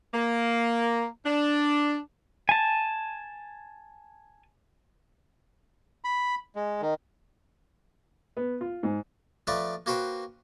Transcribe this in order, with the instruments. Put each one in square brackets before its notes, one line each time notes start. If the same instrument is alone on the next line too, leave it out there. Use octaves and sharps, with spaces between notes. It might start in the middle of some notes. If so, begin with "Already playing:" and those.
[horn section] A#3
D4
[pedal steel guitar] G#5 A5
[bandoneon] B5
G#3
D#3
[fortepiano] B3
F4
G#2
[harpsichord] F3 A3 D#4 B4 D5
A#3 F#4 B4 C5 G5